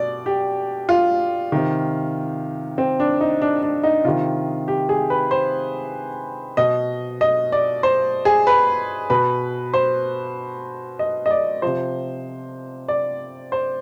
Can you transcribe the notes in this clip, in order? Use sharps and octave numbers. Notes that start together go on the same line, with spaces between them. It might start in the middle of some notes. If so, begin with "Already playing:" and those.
Already playing: B2 D5
G4
F4
C3 D#3
C4
D4
D#4
D4
D4
D#4
C3 D#3 F4
G4
G#4
B4
C5
B2 D#5
D#5
D5
C5
G#4
B4
B2 B4
C5
D#5
D#5
D5
C3 F3 C5
D5
C5